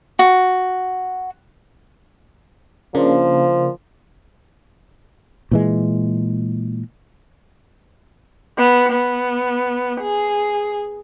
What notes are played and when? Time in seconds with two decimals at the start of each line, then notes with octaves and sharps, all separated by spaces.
0.19 F#4
2.95 C#3 F3 A#3 D4
5.51 A#2 E3 G#3
8.58 B3
8.92 B3
10.01 G#4